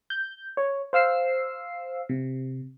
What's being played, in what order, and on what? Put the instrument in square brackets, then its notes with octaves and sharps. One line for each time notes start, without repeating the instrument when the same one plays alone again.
[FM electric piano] G6
C#5
C5 F5 E6 C7
C3